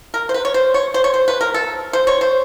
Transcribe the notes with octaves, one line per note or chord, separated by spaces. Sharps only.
A#4
C5
B4
C#5
C5
C#5
C5
C#5
C5
B4
A#4
A4
C5
C#5
C5